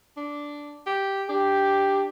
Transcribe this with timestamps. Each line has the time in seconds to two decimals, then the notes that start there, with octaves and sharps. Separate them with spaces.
0.17 D4
0.86 G4
1.29 D4 G4